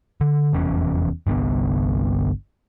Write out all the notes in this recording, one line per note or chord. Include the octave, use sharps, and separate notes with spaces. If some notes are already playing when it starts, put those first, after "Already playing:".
D3
F1 E2 C#4
G1 C2 D3 B3